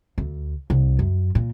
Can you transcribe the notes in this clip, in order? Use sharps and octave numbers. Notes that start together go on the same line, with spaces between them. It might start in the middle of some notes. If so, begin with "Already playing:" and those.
D2
C2
F#2
A#2